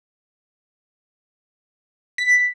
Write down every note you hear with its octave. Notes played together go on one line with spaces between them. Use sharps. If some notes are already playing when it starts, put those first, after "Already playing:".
B6